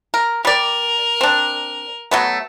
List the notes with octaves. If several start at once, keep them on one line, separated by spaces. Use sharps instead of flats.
A#4
G3 A#4 D5
C4 D4
F#3 A3 B3